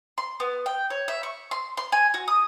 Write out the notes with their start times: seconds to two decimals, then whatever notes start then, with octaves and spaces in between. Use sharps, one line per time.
0.18 C6
0.40 B3
0.66 G5
0.90 C#5
1.08 E5
1.23 C#6
1.51 C6
1.77 C6
1.92 G#5
2.14 F#4
2.28 D#6